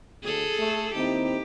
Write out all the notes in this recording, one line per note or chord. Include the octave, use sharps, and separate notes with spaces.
D2 G#4 A4
A3
D#2 C4 D#4 E4 G4